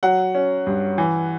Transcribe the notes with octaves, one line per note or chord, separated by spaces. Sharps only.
F#3 F#5
C#4
G2
E3